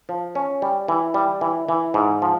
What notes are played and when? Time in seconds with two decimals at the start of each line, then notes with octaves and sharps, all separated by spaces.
0.09 F3
0.35 C#4
0.62 G3
0.88 E3
1.14 G3
1.41 E3
1.69 E3
1.94 G#2
2.22 F3